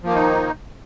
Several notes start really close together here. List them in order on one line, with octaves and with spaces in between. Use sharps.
F3 A#3 D#3 D#4